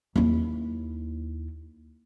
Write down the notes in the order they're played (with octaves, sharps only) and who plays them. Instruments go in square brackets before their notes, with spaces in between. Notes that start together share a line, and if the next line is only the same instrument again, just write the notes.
[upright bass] D#2 E4